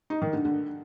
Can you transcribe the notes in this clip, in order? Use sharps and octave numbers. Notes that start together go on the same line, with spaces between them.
D#4
D#3
D3
D3